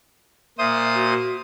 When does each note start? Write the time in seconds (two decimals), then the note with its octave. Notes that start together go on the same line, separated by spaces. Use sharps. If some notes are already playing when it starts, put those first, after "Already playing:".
0.58 A#2 C5 E5 D#6
0.95 F#4